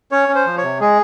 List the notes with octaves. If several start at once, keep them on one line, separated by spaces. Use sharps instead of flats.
C#4 C#5
C#4
C5
F3
C#5
C3
G#3 G#4